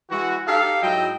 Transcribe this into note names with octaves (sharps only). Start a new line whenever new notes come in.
E3 G#3 E4 F#4
D#4 G4 A4 F5
G#2 F#3 E4 D#5 G5